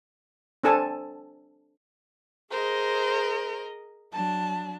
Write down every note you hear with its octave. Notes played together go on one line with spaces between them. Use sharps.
C4 D4 A4 G#5 A5
G#4 A#4 C5 D#5
F#3 D4 A5